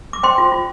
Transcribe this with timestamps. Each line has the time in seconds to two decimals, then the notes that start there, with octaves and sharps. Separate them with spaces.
0.13 D6
0.23 C5 G5 C6
0.38 F4
0.52 F4